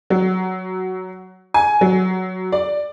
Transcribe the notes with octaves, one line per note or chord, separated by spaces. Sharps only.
F#3
G#5
F#3
D5